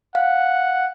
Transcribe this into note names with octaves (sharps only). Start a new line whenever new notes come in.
F5 F#5